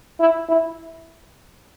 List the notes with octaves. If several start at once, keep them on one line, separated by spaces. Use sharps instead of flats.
E4
E4